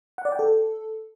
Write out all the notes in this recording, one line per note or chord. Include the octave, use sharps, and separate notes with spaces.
F#5
D5
G5
A4